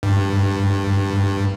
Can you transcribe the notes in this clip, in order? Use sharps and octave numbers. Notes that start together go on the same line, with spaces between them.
G2